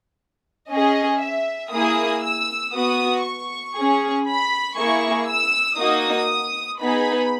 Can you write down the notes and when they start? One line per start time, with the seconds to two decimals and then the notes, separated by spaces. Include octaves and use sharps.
0.70 C#4 G#4 D#5
1.21 E5
1.72 A#3 E4 G#4 D#6
2.23 E6
2.74 B3 F#4 D#6
3.24 C#6
3.75 C#4 G#4
4.26 B5
4.77 A#3 E4 G#4 C#6
5.28 E6
5.79 A#3 D#4 F#4 D#6
6.80 B3 D#4 G#4 B5